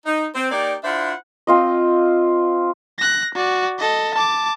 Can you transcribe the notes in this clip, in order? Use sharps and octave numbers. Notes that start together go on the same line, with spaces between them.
D#4
C4
A#3 D#4 G4 D5
D4 E4 F4 C5 E5 F#5
C4 F4 D#5
F#6 A#6
F#4 D5
A4 D#5
A5 D6